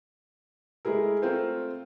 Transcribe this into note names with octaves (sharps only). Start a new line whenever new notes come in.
G#3 A3 E4 G#4 A#4
A3 C4 F4 A#4 C5